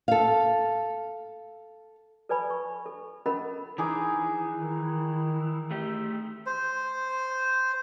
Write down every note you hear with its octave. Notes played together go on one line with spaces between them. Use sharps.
A4 F5
A4 B4 D5 G#5 B5
C#6
A4
C#4 A4 A#4 D#5 F#5 B5
E3 D#4 G#4 D6
D#3
A3 G4
C5